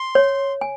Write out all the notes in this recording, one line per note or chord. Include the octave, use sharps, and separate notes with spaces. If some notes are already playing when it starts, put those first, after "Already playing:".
Already playing: C6
C#5
G#5